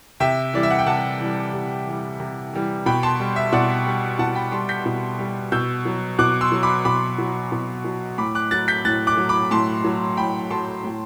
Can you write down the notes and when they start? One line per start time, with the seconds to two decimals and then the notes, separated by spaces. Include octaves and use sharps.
0.20 C3 E5 G5
0.53 E3 G3 D5
0.63 E5
0.71 F#5
0.79 G5
0.86 C3 F#5 A5
1.20 E3 G3
1.53 C3
1.86 E3 G3
2.20 C3
2.53 E3 G3
2.86 B2 G5 B5
3.03 A5 C6
3.20 G3
3.36 E5
3.52 B2 D5 F#5
3.86 G3
4.19 B2 F#5 A5
4.35 G5 B5
4.52 G3 A5 C6
4.69 G6 B6
4.86 B2
5.19 G3
5.52 B2 E6 G6
5.85 F#3
6.19 B2 D6 F#6
6.41 C6 E6
6.52 F#3
6.63 B5 D6
6.85 B2 B5 D6
7.18 F#3
7.52 B2
7.85 F#3
8.18 A2 B5 D6
8.35 D6 F#6
8.51 F#3 F#6 A6
8.68 G6 B6
8.85 A2 F#6 A6
9.07 D6 F#6
9.17 F#3
9.29 B5 D6
9.51 A2 A5 C6
9.85 F#3
10.17 A2 G5 B5
10.51 F#3 A5 C6
10.84 A2